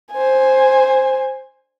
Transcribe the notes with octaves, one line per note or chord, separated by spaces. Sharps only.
C5 G#5